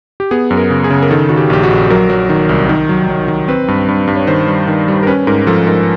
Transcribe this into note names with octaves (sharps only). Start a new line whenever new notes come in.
G4
B3 G#4
F#2
A#4
C#3
G#4
C#3
A#4
D#3 A4
D#3 F#4
G4
A#1 G4
F#4
A#1
F#3 A#4
F#3
D#3
C2
D#3
F#3
F#3
D#3
C4 B4
G2
G2
G2
C#5
D#3 C5
G3
D#3
G3
A#4
C#4 B4
G#2 A#4
F3 A4
G#2 A#4